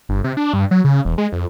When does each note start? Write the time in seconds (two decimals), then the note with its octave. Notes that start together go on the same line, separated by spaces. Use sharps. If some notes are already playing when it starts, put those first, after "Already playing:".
0.09 G1
0.24 C3
0.37 D4
0.53 G2
0.71 F#3
0.84 C#3
1.05 E1
1.18 G#3
1.32 F2